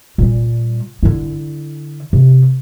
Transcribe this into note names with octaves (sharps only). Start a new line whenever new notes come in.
A#2 G3
D3 E4
C3